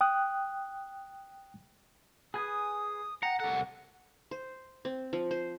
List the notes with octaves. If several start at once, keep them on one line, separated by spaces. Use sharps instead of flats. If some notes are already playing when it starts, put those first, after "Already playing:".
G5 D#6 F#6
G#4 B4 G#5 D#6
F#5 G5 A#5
C2 A4 F#5
C5
C4
F3
C5